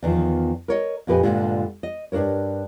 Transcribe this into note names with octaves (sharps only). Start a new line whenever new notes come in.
E2 D#3 F3
A#4 C#5 D#5
F2 A#2 G4 B4 D#5 G#5
G2 A#2 D3 G#3
D#5
G2 D4 F#4 A#4 C#5